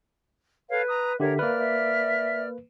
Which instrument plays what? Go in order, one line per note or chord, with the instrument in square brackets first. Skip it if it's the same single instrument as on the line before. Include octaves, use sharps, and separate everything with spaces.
[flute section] A4 C#5 F5 [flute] B4
[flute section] A#5 D#6
[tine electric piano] D3 G4 [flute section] A#4 C#5 [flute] E5
[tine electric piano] A#3 B4 [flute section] D5 F6
[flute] E5